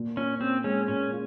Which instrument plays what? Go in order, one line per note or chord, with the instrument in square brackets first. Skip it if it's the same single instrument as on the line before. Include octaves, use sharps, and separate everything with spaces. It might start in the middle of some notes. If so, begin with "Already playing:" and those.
Already playing: [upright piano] A#2
[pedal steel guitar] C#4 [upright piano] F4
[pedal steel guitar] C4 [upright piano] C#4
[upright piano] G#3 [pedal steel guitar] C#4
[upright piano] A#2 [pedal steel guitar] C#4
[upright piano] F4